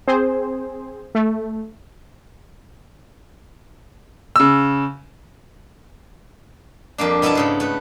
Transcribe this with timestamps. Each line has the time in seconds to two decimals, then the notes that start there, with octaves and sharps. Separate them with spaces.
0.08 C4 G#4 C5
1.15 A3
4.36 C#3 E6
6.98 F2 G3 A#3 D4
7.22 B2 B3 E4 E5 A5
7.35 G#2 C#3 A4
7.60 A3 B4